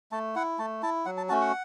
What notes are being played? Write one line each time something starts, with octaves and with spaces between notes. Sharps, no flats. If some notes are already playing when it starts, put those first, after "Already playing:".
A3 A5
E4 F#5
A3 A5
E4 A5
F#3 F#5
A5
A3 C#4 F#4 A5
F#5